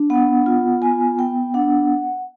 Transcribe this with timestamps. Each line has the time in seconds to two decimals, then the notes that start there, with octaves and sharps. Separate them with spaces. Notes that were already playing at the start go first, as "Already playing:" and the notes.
Already playing: D4
0.10 B3 F#5
0.46 F4
0.82 B3 G#5
1.18 B3 G5
1.54 D4 F#5